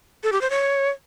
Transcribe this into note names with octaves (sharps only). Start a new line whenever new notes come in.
A4
G4
C5
C#5